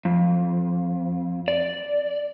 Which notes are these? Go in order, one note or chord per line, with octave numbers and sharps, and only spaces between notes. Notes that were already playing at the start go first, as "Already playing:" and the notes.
F2
D5